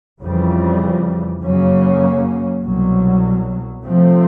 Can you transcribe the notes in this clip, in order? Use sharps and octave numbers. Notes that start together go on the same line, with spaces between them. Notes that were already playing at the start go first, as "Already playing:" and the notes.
F2 C#3 E3 G3
F#2 C#3 F#3 A#3 C#4
C2 B2 F#3
C3 F3 A3 C4